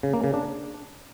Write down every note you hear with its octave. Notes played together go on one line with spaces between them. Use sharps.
C#3
A#3
C#3
D4